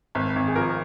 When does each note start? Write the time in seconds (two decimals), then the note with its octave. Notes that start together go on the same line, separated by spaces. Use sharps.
0.15 G#1
0.36 G#1
0.47 G#4
0.55 F3 A#4